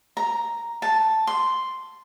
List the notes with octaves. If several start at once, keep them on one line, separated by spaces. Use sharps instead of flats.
A#5
A5
C6